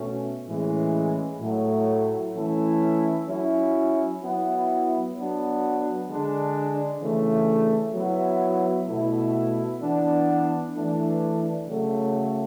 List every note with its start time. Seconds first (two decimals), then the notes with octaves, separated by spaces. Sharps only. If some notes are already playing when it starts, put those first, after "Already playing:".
Already playing: B2 A3 C#4
0.47 A2 E3 G#3 C#4
1.40 A2 F#3 A3
2.34 E3 A3 C#4 E4
3.27 F#3 C#4 E4
4.21 F#3 B3 E4
5.14 F#3 B3 D4
6.08 D3 G#3 D4
7.00 C#3 E3 A3 D4
7.94 F#3 B3 E4
8.88 B2 A3 E4
9.81 E3 B3 D4
10.75 E3 A3 D4
11.68 C#3 F#3 A3